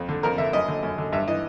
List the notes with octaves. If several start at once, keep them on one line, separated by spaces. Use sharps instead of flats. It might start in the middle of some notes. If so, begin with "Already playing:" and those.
Already playing: F2
D3
F2 A#4
D3 E5
F#2 D#5
D3
F#2
D3
G2 E5
E3 D#5